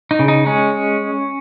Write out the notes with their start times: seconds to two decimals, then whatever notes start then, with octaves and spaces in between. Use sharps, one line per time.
0.11 D#4
0.19 C#3
0.28 D#4
0.46 G#3 C#4